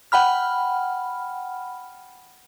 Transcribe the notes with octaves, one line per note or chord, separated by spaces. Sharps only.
F#5 G5 B5 F6